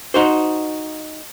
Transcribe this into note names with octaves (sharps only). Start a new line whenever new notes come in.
D#4 F#4 C5